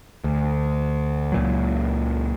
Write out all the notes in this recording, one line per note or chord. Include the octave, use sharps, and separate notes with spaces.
D2
C#2 A#2 F#3